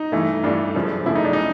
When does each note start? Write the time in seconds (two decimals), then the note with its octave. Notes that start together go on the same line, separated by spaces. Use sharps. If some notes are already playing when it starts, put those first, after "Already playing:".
Already playing: D#4
0.12 G2 E3 A3
0.44 G2 E3 A3 D4
0.75 F#2 C#3 F3 A3
1.06 F#2 C#3 F3 A3 E4
1.15 D#4
1.24 D4
1.33 D#4